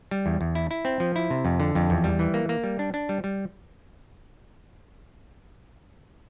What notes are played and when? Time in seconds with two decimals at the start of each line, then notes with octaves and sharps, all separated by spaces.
0.11 G3
0.26 E2
0.41 E2
0.55 E4
0.71 E4
0.85 C4
1.00 F3
1.16 E4
1.30 C3
1.45 F2
1.60 D3
1.75 F2
1.90 E2
2.04 G3
2.19 E3
2.34 A#3
2.49 A#3
2.64 G3
2.79 D4
2.94 D4
3.09 G3
3.24 G3